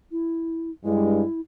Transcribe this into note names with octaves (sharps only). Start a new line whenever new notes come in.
E4
G2 G#3 E4